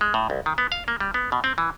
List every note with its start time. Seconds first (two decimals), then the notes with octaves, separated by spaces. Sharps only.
0.01 G#3
0.14 A2
0.30 C2
0.46 D#3
0.58 B3
0.72 F5
0.88 A#3
1.00 G3
1.14 B3
1.32 B2
1.44 C4
1.58 E3